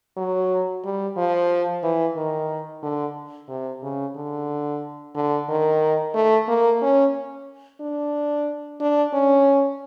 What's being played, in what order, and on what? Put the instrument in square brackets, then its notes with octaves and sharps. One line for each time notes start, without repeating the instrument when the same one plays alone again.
[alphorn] F#3
G3
F3
E3
D#3
D3
C3
C#3
D3
D3
D#3
A3
A#3
C#4
D4
D4
C#4